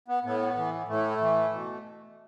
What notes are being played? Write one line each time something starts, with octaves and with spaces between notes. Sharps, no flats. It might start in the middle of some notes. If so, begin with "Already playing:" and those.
B3
A2 B3
E3
A2 A3
E3
B2